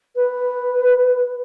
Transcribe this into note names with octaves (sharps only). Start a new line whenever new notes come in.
B4